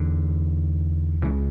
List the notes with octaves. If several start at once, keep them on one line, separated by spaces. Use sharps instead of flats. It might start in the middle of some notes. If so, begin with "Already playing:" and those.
Already playing: E2 D3
C#2 C#3 E3